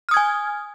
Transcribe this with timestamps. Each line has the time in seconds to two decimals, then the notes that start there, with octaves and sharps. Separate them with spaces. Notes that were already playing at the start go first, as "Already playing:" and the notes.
0.09 F6
0.11 D#6
0.14 G#6
0.17 G#5